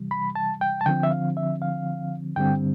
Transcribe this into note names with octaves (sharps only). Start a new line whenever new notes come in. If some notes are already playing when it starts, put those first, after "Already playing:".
Already playing: C3 E3 G3
B5
A5
G5
A5
D3 F3 C4 G5
E5
F5
E5
F5
G2 D3 G3 C4 G5